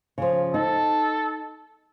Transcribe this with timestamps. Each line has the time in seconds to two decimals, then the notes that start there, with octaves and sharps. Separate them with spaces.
0.18 C#3 F3
0.54 D#4 A4